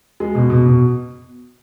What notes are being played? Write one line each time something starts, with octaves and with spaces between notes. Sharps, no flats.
G#3
B2
B2
B2